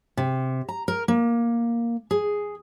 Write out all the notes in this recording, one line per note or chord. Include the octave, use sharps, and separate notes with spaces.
C3
A#5
A#4
A#3
G#4